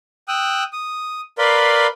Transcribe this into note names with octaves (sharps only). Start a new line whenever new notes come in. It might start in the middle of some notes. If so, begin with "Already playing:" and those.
G5 D#6 E6 F#6
D#6
A#4 B4 D5 F5 B5 C6